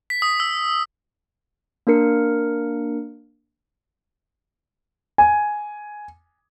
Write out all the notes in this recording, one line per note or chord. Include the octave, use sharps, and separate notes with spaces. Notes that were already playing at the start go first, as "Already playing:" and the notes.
B6
D#6
E6
A#3 D4 A#4 C#7
G#5